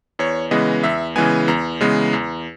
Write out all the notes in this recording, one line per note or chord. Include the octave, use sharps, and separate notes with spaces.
E2 C#5
C#3 E3 G#3 B3 D#5
E2 E5
C#3 E3 G#3 B3 G#5
E2 A#5
C#3 E3 G#3 B3
E2